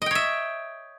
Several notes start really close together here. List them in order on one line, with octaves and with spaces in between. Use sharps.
D#5 G5 C#5 E5